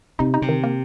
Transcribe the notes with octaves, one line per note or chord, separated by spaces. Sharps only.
C3 D#4
D#4
C3
D#3
A#3